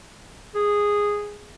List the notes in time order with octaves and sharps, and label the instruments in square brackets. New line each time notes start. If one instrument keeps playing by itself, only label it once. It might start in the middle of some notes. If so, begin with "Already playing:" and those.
[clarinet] G#4